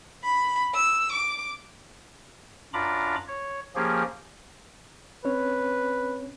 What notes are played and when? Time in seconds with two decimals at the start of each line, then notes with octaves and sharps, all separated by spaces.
0.24 B5
0.74 E6
1.12 D6
2.74 F#2 D4 F4 A#5 B5 D6
3.28 C#5
3.76 F3 A#3 C#4 G4 G#4
5.25 C4 C#4 B4 C#5